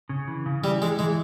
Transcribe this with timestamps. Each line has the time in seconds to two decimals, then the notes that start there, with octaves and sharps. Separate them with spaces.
0.09 C#3
0.28 E3
0.46 C#3
0.63 E3 G3
0.82 E3 G#3
0.99 E3 G#3